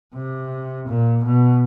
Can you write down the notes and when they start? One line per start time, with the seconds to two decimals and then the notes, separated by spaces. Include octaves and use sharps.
0.15 C3
0.88 A#2
1.23 B2